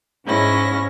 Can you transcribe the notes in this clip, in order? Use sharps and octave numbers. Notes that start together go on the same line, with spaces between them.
G#2 G#3 C#4 E4 A#6